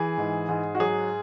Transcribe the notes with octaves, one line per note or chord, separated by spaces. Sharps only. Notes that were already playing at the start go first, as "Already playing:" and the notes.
Already playing: E3 G#4
G#2
G#2
F#4
F#3 G#4